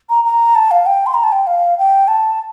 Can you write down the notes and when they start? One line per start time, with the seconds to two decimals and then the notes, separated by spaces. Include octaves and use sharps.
0.10 A#5
0.25 A#5
0.55 A5
0.71 F5
0.86 G5
1.06 C6
1.14 A#5
1.23 A5
1.32 G5
1.47 F5
1.78 G5
2.08 A5